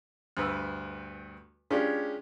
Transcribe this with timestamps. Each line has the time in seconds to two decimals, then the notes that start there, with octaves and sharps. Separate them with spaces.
0.37 D2 G2 B4 E6
1.71 G#3 C#4 D4 F4 G4